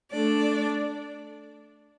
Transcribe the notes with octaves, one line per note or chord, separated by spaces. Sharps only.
A3 D4 A4 D5